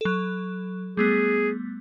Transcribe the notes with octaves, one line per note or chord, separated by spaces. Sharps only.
F#3 A4
G3 A3 B3 G#4